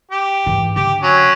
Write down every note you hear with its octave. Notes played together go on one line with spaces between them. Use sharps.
G4
G#2 E3
D3 G4
F#3 C#4